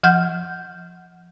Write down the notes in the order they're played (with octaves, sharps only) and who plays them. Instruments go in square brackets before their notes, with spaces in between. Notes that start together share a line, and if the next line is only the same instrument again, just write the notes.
[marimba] F3 F#5 F6 G6